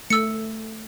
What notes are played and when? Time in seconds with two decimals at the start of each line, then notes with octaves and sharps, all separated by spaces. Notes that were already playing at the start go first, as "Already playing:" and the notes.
0.10 A3 E6 C#7